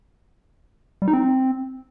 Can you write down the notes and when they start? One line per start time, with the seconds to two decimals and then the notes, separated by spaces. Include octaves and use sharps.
1.02 G3
1.08 D#4
1.13 C4